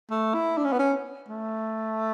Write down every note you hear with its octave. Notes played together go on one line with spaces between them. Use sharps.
A3
E4
D4
C#4
B3
C#4
A3